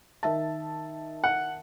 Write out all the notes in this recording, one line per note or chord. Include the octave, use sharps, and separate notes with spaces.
D#3 E5 A5
F#5